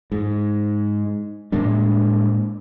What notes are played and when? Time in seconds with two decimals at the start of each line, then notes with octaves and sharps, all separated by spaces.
0.12 G#2
1.52 A2 G#3 A#3 D4